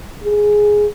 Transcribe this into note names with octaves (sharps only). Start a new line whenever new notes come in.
G#4